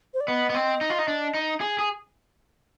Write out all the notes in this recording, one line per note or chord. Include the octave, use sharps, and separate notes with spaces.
C5
D5
B3 D#5
B3
C4
D#4
F4
D#4
D4
D#4
G#4
G#4